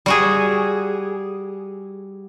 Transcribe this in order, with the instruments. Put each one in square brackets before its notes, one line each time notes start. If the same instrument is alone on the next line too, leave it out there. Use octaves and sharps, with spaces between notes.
[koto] G3 F#4 G#4